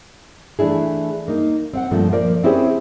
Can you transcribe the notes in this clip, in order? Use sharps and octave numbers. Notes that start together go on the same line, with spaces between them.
E3 A3 D4 E4 G#4
A#3 D#4
C4 F5 F#5
G2 A#2 F3 A3
F3 A#3 A#4 C5 D5
C4 C#4 E4 G4 G#4 C5